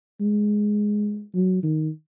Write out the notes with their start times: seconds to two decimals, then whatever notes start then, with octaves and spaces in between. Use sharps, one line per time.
0.21 G#3
1.34 F#3
1.63 D#3